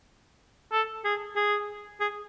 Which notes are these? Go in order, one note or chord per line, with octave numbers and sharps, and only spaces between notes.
A4
G#4
G#4
G#4